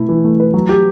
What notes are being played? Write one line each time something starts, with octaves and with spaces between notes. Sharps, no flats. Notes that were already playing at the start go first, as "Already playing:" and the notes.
Already playing: B2 A3 E4
E3
A3
B4
F#3
G4